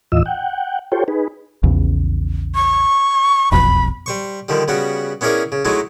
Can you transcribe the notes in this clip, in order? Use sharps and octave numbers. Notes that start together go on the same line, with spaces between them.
D#2 A2 E3 F4 D#5 E6
F#5 G5
F4 G4 A4 C5 C#5 G5
D#4 G#4 B4
A#1 E2 C#3
C#6
E1 B1 F2 B5
G3 C5 C#6
D3 D#3 F3 G3
C#3 G3 B3 F#4
B3 C#4 E4 G#4 A#4 D5
C#3
F#3 G#3 A3 D#4 E4